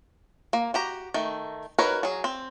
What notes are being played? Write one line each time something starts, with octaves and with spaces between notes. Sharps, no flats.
A#3
F#4 G4 A#5
D#3 A3
D#4 F#4 A#4 B4 C#5
F#3 G#4
C4